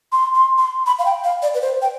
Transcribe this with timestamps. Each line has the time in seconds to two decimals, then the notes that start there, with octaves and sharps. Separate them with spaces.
0.12 C6
0.34 C6
0.58 C6
0.86 B5
0.99 F5
1.05 G5
1.24 F5
1.42 D5
1.54 B4
1.61 C5
1.82 G5